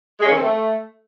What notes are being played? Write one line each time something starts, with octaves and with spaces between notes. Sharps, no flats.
G#3
C#4
D#3
C4
A3